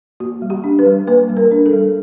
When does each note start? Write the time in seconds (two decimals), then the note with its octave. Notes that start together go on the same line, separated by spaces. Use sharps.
0.20 A#3 F#4
0.42 G3
0.50 G4
0.64 D4
0.79 B4
0.86 G3
1.08 A#3 B4
1.29 G3
1.37 A#4
1.51 D4
1.66 A4
1.73 G3